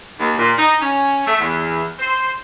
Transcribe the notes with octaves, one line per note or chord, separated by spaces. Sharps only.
D#2
A#2
D#4
C#4
A3
E2
C5